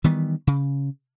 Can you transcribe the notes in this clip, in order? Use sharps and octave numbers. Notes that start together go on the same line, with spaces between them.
D#3 E3 G3 B3
C#3